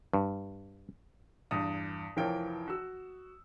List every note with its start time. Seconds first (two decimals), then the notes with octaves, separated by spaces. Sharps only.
0.13 G2
1.51 E2 G2 D#6
2.16 F1 E3 F3 A#4 C#5 G5
2.68 F#4 E6